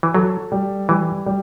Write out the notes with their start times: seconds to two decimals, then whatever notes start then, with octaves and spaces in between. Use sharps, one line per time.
0.03 E3
0.14 F#3 A4
0.52 G3
0.89 E3 G3
1.26 G3